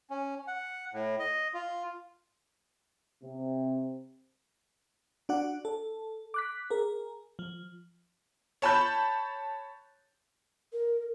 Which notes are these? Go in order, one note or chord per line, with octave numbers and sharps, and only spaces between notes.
C#4
F#5
A2
D#5
F4
C3
D4 F#4 D5 F#5
A4
D6 F#6 B6
G#4 A#4
F3
C#5 A5 B5 G6
A#4